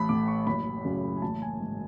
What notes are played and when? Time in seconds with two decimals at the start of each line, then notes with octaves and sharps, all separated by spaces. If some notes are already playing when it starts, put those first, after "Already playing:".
Already playing: A1 A5 B5
0.09 A2 D6
0.28 C#6
0.47 F#1 B5
0.85 F#2 C#3
1.17 G#5
1.22 A1 A5
1.42 G#5
1.61 G#2